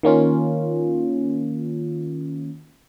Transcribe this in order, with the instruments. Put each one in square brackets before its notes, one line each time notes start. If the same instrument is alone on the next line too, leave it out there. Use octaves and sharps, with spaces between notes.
[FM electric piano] D#3 A#3 C#4 F4